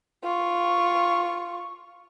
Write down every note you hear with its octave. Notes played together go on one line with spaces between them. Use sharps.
F4 C#6